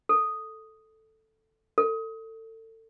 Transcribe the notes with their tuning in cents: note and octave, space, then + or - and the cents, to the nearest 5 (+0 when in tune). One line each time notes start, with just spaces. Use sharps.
A4 +0
A4 +30